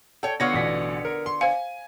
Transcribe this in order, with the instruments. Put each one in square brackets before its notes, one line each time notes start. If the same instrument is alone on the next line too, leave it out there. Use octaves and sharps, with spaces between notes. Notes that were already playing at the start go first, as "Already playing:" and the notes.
[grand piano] A4 [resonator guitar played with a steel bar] C#5 G5
[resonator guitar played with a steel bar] D3 B3 F4 [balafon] C#5 [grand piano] C#6 G#6 A#6
[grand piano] A1 B2 B6
A#4
C6
[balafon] C5 F5 [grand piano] G#5